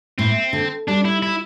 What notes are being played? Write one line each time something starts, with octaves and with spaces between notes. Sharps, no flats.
A2 C4
D3
G3 D4
E4
E4